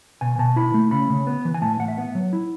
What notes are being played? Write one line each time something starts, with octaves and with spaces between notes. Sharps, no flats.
B2 G#5
B2 A5
E4 B5
A3
C#3 B5
C#3
B3
E3
G#5
A2 A5
A2 F#5
E5
B3 F#5
F#3
E4